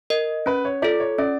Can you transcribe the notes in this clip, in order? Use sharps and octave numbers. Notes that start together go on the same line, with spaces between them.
A#4 D#5
C#4 B4
C#5
F4 A4 D5
C#5
C#4 D5